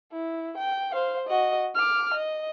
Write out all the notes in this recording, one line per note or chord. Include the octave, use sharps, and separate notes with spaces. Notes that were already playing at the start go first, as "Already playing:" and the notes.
E4
G5
C5 F5
F#4 D#5
D6 F6
D#5